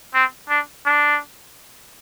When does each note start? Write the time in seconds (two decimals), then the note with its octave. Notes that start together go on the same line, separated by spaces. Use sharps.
0.14 C4
0.49 D4
0.86 D4